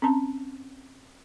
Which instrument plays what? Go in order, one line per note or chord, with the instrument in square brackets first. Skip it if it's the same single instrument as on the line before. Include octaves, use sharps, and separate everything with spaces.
[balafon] C4 C#4 A5 A#5